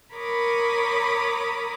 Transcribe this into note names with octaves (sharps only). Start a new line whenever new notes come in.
A#4 C#5 B5 D6 D#6